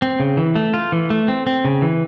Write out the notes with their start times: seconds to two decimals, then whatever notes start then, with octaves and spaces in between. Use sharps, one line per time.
0.02 C4
0.20 C#3
0.37 E3
0.56 A3
0.74 F4
0.92 E3
1.10 A3
1.28 C4
1.47 C4
1.65 C#3
1.82 E3